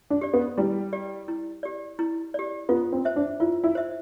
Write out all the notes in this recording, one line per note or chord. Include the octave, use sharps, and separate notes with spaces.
D4
G4 D5
B3
G3 E4
G4 D5
E4
G4 D5
E4
G4 D5
B3 F4
C4
C5 E5
D4
E4 F4
E4
C5 E5